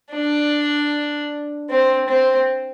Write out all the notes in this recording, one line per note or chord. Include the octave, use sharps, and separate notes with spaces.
D4
C4
C4